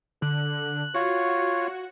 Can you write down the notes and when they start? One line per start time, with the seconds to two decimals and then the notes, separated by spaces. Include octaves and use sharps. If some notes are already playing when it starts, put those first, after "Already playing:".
0.22 D3 F#6
0.94 F4 F#4 C#5